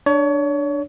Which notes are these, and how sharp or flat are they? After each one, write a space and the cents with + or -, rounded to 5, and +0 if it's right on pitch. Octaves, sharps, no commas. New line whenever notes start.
D4 +5 C#5 +30